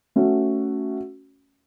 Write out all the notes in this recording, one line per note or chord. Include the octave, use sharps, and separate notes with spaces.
A3 C#4 F#4